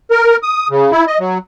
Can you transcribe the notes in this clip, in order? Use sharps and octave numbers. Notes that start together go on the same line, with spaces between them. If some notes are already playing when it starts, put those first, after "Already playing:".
A#4
D#6
C#3
E4
D#5
F#3